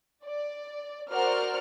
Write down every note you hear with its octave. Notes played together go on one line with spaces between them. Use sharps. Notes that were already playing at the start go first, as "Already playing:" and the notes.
D5
F#4 A#4 C5 D5 F#5 F6